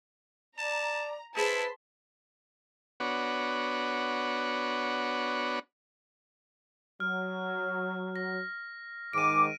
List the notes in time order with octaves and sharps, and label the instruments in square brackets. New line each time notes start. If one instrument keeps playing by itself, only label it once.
[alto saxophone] D5 [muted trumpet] A5 [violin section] A#5
[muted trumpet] E4 [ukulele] G#4 C5 [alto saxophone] B4 [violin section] A5 C6 B6
[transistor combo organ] B3 D4 F#4 C#5
[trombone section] F#3 [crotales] F6
[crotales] A#6
[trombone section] G#2 D#3 [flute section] D6 [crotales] D7 D#7